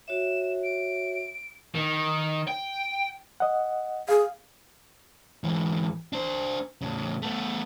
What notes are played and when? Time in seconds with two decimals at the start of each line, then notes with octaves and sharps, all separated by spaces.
0.08 F#4 C#5 E5 E7
0.64 D7
1.75 D#3
2.47 G5
3.40 D#5 F#5
4.09 G#4 F5
5.44 G#2 E3
6.13 D4 C5
6.81 A2 C#3
7.22 A3 B3